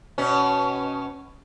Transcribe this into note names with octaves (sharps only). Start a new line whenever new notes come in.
B2 C#4